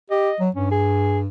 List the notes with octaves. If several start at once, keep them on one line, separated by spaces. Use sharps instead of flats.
G4 D#5
F#3
G2 C#4
G#4